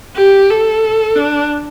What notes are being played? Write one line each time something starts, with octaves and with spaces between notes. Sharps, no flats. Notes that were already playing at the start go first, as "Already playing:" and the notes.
G4
A4
D4